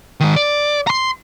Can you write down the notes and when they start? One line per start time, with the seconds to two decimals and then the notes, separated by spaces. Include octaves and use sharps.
0.20 D#3 G#3
0.36 D5
0.87 A#5 C6